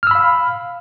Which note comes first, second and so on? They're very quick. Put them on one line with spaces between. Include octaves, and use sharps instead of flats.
F6 E6 B5 F5